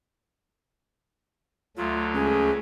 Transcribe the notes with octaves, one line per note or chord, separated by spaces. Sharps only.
D2 F#3 A3 F4
C#2 G#4